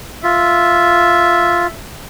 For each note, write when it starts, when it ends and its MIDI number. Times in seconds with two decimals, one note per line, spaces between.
0.24 1.67 65
0.24 1.72 76